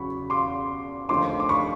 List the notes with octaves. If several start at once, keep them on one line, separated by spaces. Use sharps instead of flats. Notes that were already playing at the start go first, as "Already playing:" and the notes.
Already playing: E2 C#3 F#3 B5 C#6
C6 D6
F1 D#2 D3 F3 C6 D6
D6
B5 C#6